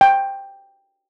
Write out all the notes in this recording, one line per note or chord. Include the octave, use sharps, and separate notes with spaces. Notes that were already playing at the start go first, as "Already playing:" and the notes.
G5